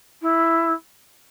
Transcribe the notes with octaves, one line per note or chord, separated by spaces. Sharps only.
E4